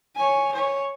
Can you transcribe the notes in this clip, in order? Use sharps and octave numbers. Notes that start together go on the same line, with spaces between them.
C#5 G#5
C#5 G#5